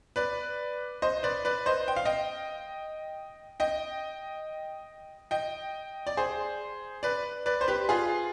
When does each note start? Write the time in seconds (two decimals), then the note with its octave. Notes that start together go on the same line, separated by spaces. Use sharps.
0.16 B4 D5
1.02 C5 D#5
1.23 B4 D5
1.45 B4 D5
1.66 C5 D#5
1.88 G5
1.96 F5
2.05 D#5 G5
3.60 D#5 G5
5.31 D#5 G5
6.07 D5
6.17 G#4 C5
7.03 B4 D5
7.46 B4 D5
7.61 C5
7.68 G4 B4
7.89 F4 G#4